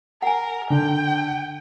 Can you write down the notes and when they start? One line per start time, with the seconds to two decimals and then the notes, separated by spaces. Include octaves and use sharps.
0.22 A#4 F#5 G#5
0.70 D3 G5